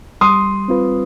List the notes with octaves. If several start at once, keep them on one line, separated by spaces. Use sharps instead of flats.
G3 C6 D#6
C4 F4 B4